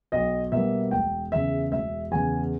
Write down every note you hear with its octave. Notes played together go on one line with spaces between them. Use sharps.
B1 D#5
B2 G3 A#3 E5
E1 G5
E2 C#3 E5
E1 E5
E2 C#3 G#5